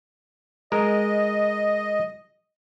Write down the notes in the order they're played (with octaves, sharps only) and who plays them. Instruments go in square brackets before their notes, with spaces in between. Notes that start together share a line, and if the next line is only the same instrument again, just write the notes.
[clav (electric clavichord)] G#3 A#4 [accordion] D#5